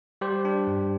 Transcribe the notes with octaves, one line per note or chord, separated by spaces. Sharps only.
G3 G4 C5
D4
G2